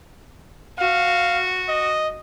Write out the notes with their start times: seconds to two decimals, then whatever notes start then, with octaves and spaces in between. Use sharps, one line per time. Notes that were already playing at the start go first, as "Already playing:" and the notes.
0.79 F#4 F5
1.68 D#5